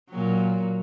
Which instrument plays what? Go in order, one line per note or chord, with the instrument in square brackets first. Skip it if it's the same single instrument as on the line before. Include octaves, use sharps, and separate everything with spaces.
[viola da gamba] A#2 F#3